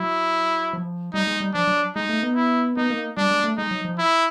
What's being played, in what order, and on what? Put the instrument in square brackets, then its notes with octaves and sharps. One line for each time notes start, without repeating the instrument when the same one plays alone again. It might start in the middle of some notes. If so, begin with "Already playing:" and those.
Already playing: [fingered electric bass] F#3 [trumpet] E4
[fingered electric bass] F3
[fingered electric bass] G3 [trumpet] D#4
[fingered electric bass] G#3
G3
[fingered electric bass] F3 [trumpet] D4
[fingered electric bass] F#3
[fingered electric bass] G#3 [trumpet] D#4
[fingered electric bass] A3
B3
[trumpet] E4
[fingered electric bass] B3 [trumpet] D#4
[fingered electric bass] A#3
[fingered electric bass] G3 [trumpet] D4
[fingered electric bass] G#3
A3
[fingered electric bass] G#3 [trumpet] D#4
[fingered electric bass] F#3
F3
[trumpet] E4